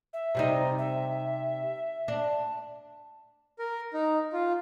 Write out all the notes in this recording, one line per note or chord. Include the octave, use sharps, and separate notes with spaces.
E5
C3 G3 D#4
E5
D4
A#4
D#4
F4